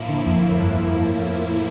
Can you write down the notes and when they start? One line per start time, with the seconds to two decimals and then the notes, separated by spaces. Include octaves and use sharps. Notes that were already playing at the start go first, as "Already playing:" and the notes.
Already playing: A2 F3 A#3 E4
0.09 D3
0.27 F2
0.43 F2
0.60 G2
0.78 F2